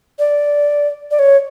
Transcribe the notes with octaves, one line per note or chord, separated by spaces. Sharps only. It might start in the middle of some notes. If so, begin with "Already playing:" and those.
D5
D5
C#5